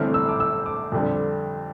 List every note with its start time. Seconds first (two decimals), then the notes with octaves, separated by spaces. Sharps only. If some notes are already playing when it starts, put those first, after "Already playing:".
Already playing: G1 G2 E3 A3 C4 F6
0.14 E6
0.29 D6
0.40 E6
0.66 D6
0.92 F2 D3 G3 C4